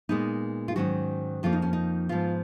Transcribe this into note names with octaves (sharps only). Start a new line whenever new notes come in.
A#2 G#3 B3 D#4
F4
G#2 D#3 F#3 C#4 F#4
F2 F3 A#3 C#4 F4
D#4
C#4
D#4
G#2 F3 B3 F4